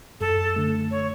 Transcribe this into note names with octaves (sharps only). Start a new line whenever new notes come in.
F#2 A4
D3 A3
C#5